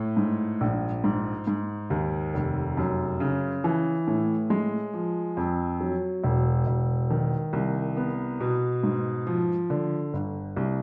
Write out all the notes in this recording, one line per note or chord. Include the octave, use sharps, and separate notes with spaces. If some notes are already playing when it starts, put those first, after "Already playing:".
Already playing: A2
G#2
A#1
G#2
G#2
D#2
F1
F#2
C#3
E3
A2
G#3
F3
F2
F#3
E1
E1
D#3
C2
B3
B2
G#2
F3
D3
G1
C2